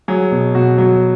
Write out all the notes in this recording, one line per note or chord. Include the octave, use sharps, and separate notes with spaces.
F#3 G#4
B2
B2 F#4
F#3